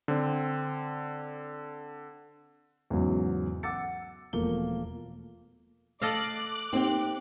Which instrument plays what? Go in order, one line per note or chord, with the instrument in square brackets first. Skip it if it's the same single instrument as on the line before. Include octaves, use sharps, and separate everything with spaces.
[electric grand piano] D3 C4
[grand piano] E2 G#2 C#3 F#3
F#5 D6 E6 A6 C#7
E1 E2 F3 A3 A#3 G7
[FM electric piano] A3 [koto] A4 D#5 F5 [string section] D6 F#6
[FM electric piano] A#3 D#4 [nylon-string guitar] C4 G4